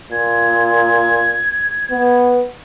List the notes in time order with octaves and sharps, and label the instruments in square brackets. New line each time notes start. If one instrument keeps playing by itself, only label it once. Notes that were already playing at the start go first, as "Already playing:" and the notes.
[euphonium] A#2 [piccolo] G#6
[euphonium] B3